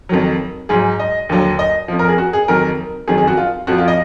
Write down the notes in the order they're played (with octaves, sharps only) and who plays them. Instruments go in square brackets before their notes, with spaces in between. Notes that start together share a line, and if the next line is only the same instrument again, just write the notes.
[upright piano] F2 D#3 F#3
G#2 F#3 G#4
D#5
D#2 D3 F#3
D#5
F2 F3
A#4
G#4
F#4
G#4
F2 D#3 F#3 A#4
F2 D#3 F#3 G#4
G#4
F#4
F4
F2 F3 F#4
F4
D#5